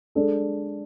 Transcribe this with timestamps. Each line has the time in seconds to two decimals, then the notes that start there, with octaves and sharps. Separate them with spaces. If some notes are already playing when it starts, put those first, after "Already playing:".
0.15 G#3 D4 A4